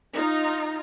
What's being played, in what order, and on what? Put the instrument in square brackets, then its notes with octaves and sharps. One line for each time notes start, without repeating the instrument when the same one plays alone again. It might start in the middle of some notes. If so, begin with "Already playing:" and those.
[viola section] D#4 F4 A#5